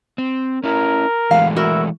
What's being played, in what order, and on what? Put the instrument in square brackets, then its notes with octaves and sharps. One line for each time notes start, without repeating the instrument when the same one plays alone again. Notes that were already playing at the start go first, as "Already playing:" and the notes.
[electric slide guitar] C4
[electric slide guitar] C#4 E4 [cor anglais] A#4
[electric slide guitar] E3 G#3 A3 [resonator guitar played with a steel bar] F5
[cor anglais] E4 [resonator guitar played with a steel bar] F#4 A#4